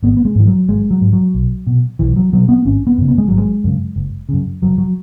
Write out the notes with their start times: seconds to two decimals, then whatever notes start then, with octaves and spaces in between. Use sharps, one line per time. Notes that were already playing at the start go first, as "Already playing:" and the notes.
0.03 G#1 B3
0.17 B3
0.25 G#3
0.35 G#2 E3
0.47 F#3
0.68 G#1 G#3
0.91 F#3
1.01 G#2
1.13 F#3
1.34 B1
1.67 B2
1.99 B1 E3
2.16 F#3
2.33 B2 F#3
2.49 B3
2.65 G#1 C#4
2.87 B3
2.98 F#2 C#3
3.08 B3
3.18 G#3
3.28 G#1 F#3
3.38 G#3
3.64 F#2 C#3
3.96 F#1
4.29 F#2 C#3
4.62 F#1 F#3
4.78 F#3